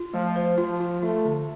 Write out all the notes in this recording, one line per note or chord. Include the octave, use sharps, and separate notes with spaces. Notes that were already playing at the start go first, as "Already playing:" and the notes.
Already playing: F4
F3 A3
C5
F3 F4
F4
A3 F4
D3